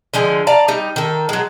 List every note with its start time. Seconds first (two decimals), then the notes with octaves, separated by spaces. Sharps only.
0.13 D3 F3 G#3 G#5
0.47 D5 F5 A5 A#5
0.68 G3 D#4
0.96 D#3 A4
1.29 F#3 G#3